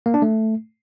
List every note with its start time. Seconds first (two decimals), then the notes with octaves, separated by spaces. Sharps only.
0.06 A#3
0.14 D4
0.22 A3